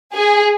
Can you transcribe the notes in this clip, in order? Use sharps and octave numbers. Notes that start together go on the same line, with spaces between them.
G#4